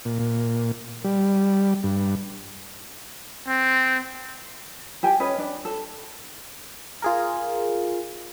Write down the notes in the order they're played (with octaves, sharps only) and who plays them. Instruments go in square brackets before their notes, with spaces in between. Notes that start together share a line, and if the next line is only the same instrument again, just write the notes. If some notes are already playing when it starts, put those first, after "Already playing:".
[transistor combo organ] A#2
A#2
G3
G2
[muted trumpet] C4
[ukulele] G4 G5 G#5
C#4 B4 D#5
D4
A4
[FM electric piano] F4 G#4 A#4